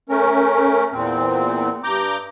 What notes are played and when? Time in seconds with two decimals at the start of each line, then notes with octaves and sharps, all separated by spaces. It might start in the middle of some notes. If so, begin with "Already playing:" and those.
0.09 A3 C#4 A#4
0.92 E2 A#2 C4
1.84 G2 A#5 D6 G6